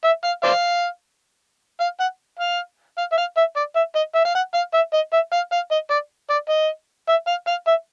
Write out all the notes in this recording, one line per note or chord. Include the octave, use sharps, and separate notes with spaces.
E5
F5
C5 D5 F5
F5
F#5
F5
F5
E5
F5
E5
D5
E5
D#5
E5
F5
F#5
F5
E5
D#5
E5
F5
F5
D#5
D5
D5
D#5
E5
F5
F5
E5